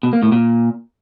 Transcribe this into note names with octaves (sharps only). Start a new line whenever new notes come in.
B2
A#3
A2
A#2